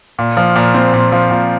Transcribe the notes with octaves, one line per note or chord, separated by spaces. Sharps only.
A#2
F3
A#2
C4
A#2
F3
A#2